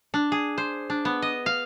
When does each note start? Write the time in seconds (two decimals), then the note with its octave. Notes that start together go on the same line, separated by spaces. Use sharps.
0.14 D4
0.32 G#4
0.58 C5
0.90 D4
1.05 B3
1.22 D#5
1.46 F5